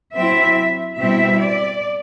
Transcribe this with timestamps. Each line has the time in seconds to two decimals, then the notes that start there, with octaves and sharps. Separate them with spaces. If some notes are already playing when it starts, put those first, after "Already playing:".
0.15 F#3 C4 E4 E5
0.98 B2 G3 C4 E4 E5
1.40 D5